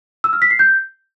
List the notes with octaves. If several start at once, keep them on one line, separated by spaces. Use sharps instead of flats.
E6
F6
B6
C7
G6